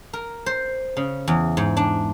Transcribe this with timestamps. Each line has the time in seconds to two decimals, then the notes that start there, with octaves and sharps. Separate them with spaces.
0.13 A#4
0.46 C5
0.97 C#3
1.28 E2
1.57 G#2
1.77 D4